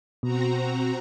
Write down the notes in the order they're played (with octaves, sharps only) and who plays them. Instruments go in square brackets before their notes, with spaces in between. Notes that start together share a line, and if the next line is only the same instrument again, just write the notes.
[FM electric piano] B2 [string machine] C4 F#4 A#5